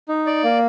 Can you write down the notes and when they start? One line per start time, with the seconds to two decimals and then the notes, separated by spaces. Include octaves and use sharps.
0.09 D#4
0.27 D5
0.44 A#3